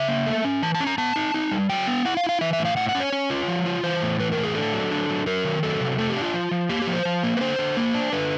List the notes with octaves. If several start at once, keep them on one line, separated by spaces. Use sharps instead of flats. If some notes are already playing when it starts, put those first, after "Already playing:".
Already playing: C#3 E5
A#3
A3
C#4
E3 A5
A5
C#4
A#5
B3 A5
D#4
D#4
G3
F#3 G5
B3
E4 F#5
F5
E4
F5
E3 E5
E5
A2
F5
A2 F#5
F#5
C#4
C#5
C#4
F4
F3
F4
E3 C5
A2
E3 B4
A#4
A2
G#4
D4 A4
F#3
D4
F#3
F#3 A#4
D#3
F#3 A4
C3
A3 A4
G4
D4
F4
F3
F3
A#3 G4
G4
F3
C5
F3
A#3
B4
D3 C5
D3
A#3
D4
D3 B4